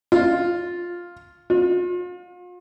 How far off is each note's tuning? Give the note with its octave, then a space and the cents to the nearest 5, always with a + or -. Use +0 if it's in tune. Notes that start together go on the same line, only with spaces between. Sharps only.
F4 +5
F4 +40